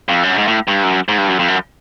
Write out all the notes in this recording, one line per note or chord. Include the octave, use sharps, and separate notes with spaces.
F2
F#2
G#2
A2
G2
F#2
G#2
G2
F#2
F2
F#2